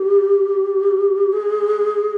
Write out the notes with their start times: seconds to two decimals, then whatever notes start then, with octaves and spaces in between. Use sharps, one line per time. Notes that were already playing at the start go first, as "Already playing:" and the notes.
Already playing: G4
1.32 G#4